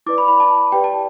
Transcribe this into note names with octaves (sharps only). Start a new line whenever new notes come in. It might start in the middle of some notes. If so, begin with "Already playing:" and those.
E4 B4 D5 D6
B5
B5
A5
G4 B4 D5 G5
A5